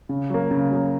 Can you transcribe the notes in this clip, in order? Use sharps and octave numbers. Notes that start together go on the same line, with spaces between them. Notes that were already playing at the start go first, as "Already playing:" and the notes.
C#3
F#3 A#3
C#3
F#3 A#3